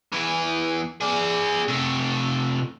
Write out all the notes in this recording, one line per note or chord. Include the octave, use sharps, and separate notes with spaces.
E2 E3
G#4 D5
C3 A3